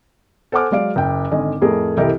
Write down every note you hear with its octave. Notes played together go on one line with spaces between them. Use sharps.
A4 C5 F#5 G#5 D6 F6
F#3 G#3 D5 F5 D7
F#1 G5
G#1 D3 D#5 G#5
F2 A2 A3 G#4 A#4 A5
C2 E3 G4 A4 A#4 D#5